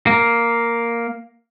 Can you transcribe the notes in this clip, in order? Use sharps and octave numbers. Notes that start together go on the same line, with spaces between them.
A#3